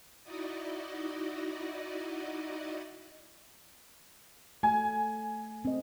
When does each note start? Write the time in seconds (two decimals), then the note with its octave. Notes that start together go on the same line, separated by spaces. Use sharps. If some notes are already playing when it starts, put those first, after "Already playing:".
0.23 D#4 E4 F#4 D5 D#5
4.63 A3 G#5
5.65 C4 D#5